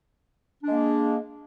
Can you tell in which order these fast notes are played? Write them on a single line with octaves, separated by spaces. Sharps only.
D4 G#3 A#3